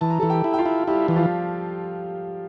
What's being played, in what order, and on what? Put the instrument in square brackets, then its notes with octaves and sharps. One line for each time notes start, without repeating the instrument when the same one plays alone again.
[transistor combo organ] E3 [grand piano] A5
[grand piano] A#5
A4 A5
[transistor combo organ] E3
[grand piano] G4 G5
[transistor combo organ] E4
[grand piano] G5
F4 F5
[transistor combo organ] E4
[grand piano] G3 G4 [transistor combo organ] E4
[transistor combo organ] E3 [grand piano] G4
[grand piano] F3 F4